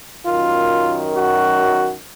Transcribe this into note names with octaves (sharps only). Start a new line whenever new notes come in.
F#2 D#3 F4
F#4